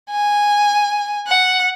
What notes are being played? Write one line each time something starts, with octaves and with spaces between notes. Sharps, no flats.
G#5
F#5